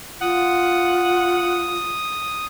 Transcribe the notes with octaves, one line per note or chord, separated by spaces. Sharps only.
F4 F#5 D#6